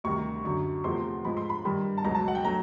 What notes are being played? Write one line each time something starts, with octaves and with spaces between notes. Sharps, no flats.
D2 C3 D#3 G3 C#6
F#2 D3 F#3 C#6
E2 C3 F3 A3 C6
G#2 F3 G#3 B5
C6
B5
G2 D#3 G3 B5
A5
C#2 B2 F#3 A#5
A5
F#5
G5
F#3 A3 A#5